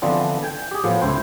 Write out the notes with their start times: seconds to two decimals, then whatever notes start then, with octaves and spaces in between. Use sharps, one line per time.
0.02 D3 E3 F3 B3 C4 D4
0.43 G5 G#5
0.71 G4 G#4
0.84 A2 F3 B3
1.01 C#2 E4 C5 G5